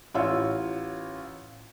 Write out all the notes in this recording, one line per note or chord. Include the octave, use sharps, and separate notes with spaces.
A1 F4 C#5 E6